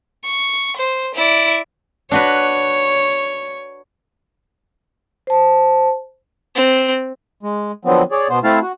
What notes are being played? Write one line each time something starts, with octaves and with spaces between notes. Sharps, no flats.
C#6
C5
E4 D5
D4 F#4 B4 C#5
C5 A5
C4
G#3
D3 F3 F#3 B3 C4
G#4 C#5 D5
B2 B3 C5
A3 C4 E4 F5 A5
F#4